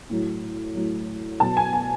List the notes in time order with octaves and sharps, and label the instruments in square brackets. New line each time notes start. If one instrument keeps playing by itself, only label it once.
[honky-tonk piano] A2 F#3
A2 F#3
B2 F#3 A5
G#5
G#5